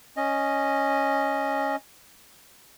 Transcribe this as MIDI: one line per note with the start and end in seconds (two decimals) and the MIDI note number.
0.17 1.76 61
0.17 1.76 75